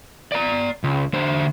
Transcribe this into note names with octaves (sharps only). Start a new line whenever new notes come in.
D5 A#5
C#2
D3 C5